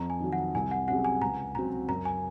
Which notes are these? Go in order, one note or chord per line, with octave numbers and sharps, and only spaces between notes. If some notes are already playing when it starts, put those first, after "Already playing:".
Already playing: F2 A#5
G#5
D#3 F#3
F#5
C2 G#5
F#5
C3 F#3 C#4 G#4 F#5
G#5
C#2 A#5
C#3 F#3 C4 F#4 A#5
F#2 A#5
G#5